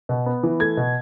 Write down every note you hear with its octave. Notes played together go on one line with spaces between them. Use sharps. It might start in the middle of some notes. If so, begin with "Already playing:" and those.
B2
B3
E3
A3 G#6
B2